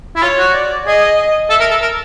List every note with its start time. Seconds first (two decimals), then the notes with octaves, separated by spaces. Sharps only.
0.16 E4
0.22 F4 C#5
0.38 F#4
0.54 D5
0.87 G#4 D#5
1.50 A4 E5
1.60 A#4
1.71 A4
1.82 A#4